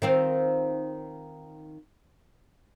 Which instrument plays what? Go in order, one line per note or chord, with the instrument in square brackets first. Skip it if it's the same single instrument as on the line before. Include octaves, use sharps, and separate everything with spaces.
[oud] D#3 C4 F4